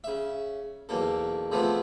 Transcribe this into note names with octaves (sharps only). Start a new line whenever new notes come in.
C#3 E5
B1 E2 A#3 A4
C3 F3 G#3 A3 B3 C4